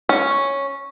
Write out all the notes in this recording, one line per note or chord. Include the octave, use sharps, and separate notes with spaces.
C#4